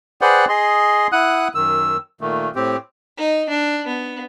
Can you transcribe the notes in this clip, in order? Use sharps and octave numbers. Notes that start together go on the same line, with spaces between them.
G#4 B4 C5 D5 F#5 G5
G#4 D#5 C6
E4 F#5 D#6 F#6
F#2 D#3 E6
A#2 D#3 A3
A2 C4 G4
D#4
D4
B3